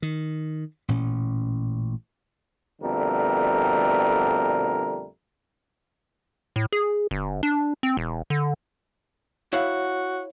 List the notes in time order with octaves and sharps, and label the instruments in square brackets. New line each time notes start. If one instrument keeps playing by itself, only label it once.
[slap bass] D#3
A1 A#2 C#4
[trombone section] F2 B2 D3 G3 A3 A#4
[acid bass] A2
G#4
G1
D4
C4
E1
D3
[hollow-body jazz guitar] E4 F5 F#5 [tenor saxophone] F#4 [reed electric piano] C#5